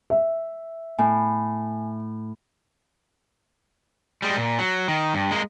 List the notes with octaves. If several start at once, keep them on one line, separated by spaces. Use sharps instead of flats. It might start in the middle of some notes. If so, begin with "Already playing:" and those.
E5
A2 G#5
G3 G#3
A#2
F#3
D#3
G2
G#3 A#3